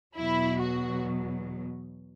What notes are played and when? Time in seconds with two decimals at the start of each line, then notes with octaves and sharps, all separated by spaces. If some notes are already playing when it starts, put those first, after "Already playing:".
0.15 E2 B2 F#3 E4
0.61 F#4